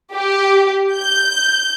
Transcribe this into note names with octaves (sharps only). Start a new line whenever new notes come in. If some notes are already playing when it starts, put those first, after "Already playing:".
G4
G6